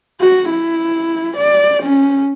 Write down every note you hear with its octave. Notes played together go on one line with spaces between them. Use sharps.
F#4
E4
D5
C#4